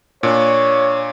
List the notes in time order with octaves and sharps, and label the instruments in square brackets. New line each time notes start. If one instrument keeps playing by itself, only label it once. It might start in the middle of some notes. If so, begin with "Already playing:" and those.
[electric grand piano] A#2 D4 [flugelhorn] C#5